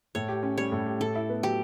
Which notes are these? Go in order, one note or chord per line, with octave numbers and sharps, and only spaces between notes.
A2 C#5
G4
C#4
G3 C#5
A2
G4
A2 A4
E4
B3
F#3 G4